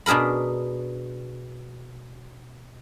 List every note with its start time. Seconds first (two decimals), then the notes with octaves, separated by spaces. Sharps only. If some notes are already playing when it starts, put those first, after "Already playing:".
0.06 B2 D4 G#4 A#4 B5